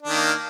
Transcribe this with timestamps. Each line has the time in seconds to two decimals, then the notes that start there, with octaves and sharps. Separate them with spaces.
0.03 D4
0.07 D#3
0.12 A#3